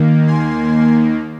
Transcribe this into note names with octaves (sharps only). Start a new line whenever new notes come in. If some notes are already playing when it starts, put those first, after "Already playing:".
Already playing: D#2 D#3 A#3
G#5 C6